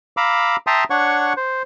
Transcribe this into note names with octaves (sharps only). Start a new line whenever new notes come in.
F5 A#5 B5 D6 E6
E5 G5 A5 A#5 C6 D#6
D4 C#5 F#5 C#6
C5